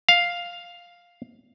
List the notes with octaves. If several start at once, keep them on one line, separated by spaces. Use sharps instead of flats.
F5